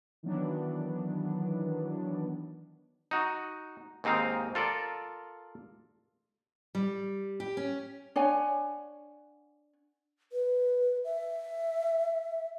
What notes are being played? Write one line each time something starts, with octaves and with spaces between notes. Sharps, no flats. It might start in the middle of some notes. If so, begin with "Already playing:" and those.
D#3 E3 F#3 B3 D4
D#4 F#4
D#2 G#2 C4 D#4 F5
F4 A4 A#4 D5
G3
G4
C#4
D4 C#5 F#5 G#5
B4
E5